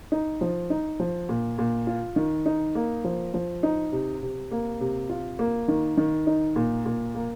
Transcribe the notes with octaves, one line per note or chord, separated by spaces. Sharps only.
D#4
F3
D#4
F3
A#2
A#2
F4
D#3
D#4
A#3
F3
F3
D#4
C3
C3
A#3
C3
F4
A#3
D#3
D#3
D#4
A#2
A#2
A#3